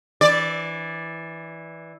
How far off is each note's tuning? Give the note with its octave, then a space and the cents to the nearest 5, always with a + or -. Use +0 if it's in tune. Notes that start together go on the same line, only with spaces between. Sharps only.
E3 -5 D5 +0